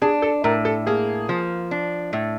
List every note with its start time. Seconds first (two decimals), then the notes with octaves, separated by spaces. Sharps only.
0.02 D4 G#4
0.22 A4
0.44 A2 A#4
0.65 A4
0.87 A#3 G#4
1.29 F3
1.71 D4
2.13 A2